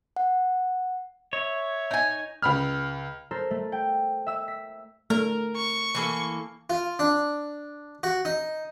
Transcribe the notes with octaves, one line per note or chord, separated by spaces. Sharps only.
F#5
C#5 E5
D#4 G#5
C#2 B5 F6
A4 A#4 C5
A3
G5
E5 E6 E7
B6
A3 A#4
C#6
E3 A#3 A4
F4
D4
F#4
D#4